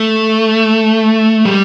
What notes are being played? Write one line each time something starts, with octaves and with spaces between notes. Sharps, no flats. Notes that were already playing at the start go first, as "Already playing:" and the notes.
Already playing: A3
G3